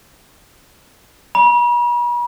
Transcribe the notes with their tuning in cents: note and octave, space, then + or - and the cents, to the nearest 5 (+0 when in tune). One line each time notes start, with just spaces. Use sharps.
B5 -45